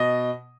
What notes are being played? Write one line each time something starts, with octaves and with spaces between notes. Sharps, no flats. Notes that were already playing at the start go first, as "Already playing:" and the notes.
Already playing: B2 D#5